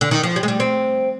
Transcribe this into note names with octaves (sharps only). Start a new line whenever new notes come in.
D3
D#3
F3
G3
G#3
G3
C4